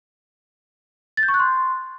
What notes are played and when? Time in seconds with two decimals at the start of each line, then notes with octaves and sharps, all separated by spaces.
1.17 A6
1.23 G6
1.28 C#6
1.34 F#6
1.40 C6